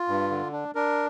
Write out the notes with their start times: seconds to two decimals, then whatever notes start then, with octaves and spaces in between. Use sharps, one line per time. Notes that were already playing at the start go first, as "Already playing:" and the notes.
Already playing: F4
0.08 G2
0.30 D3
0.52 D4
0.75 D4 A#4